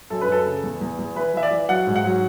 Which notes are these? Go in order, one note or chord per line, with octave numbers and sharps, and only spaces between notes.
F#2 A4
B4
F#2 A4
C#3
E2
E2
E2
E3 B4
E3 E5
D5
E3
F#3 F#5
G#2
F#5
F#3